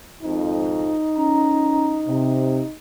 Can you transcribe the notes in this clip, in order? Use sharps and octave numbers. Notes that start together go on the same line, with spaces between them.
G#1 F2 D#4
C#4 A#5
C3